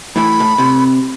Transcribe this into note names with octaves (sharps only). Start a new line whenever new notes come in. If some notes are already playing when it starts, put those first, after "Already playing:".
A2 E3 B5
A2
C3